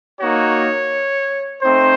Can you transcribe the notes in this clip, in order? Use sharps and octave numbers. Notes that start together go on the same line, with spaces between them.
A#3 D#4 F#4 C#5
A3 C4 D#4 C5